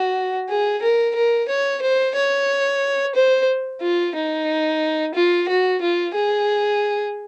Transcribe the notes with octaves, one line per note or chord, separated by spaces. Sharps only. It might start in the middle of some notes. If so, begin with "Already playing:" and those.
Already playing: F#4
G#4
A#4
A#4
C#5
C5
C#5
C5
F4
D#4
F4
F#4
F4
G#4